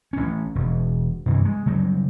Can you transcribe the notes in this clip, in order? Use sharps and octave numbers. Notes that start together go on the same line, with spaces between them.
A1 C#4
E1
G2 C3 E3
G#3
C#3 F#3 G3